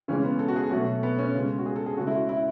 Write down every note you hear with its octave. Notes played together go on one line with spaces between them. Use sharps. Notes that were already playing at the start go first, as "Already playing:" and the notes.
C#3 E3 G#3 C#4
B3
A4
F#4
G#4
B2 F#3 A3 F#4
B3
C#4
C#3 G#3
F#4
G#4
A4
G#4
C#3 G#3 F#4
E4
F#4
E4